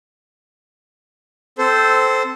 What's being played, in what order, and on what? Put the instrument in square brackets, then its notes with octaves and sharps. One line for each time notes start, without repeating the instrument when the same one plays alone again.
[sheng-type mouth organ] C4 A4 C5